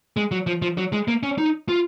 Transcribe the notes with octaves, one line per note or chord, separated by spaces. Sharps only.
G#3
F#3
F3
F3
F#3
G#3
A#3
C#4
D#4
F4